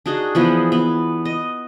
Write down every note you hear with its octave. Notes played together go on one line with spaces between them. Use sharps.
D4 D#4 F#4 G#4
E3 F3 B3 G#4
B3
D#5